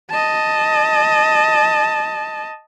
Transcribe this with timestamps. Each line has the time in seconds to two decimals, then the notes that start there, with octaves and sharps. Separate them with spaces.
0.11 D#5 A5